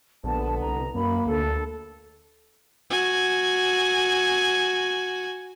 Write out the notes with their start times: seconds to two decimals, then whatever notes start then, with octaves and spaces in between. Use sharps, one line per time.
0.24 A#1 D3 B3 A5
0.60 C2 A#5
0.95 F#2 A#3 B5
1.26 D2 D4 A4
2.90 F#4 G#5